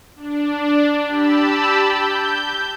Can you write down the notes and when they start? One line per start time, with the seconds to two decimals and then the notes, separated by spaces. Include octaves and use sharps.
0.16 D4
1.05 G4 A5 B5 E6
1.76 G6